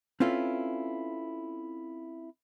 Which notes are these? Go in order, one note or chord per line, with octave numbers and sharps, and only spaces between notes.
C4 C#4 E4 F4 A4 B4